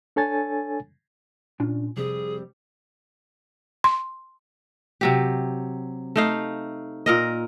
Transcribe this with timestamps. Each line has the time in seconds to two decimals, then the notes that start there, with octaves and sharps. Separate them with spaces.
0.16 D4 A4 C#5 G#5 A6
1.60 A#2 C#4 D4 F4
1.97 F2 C3 G3 C4 G#4
3.84 C6
5.01 C3 F#3 G4
6.16 A3 D#4 F5
7.06 A#2 A#4 D#5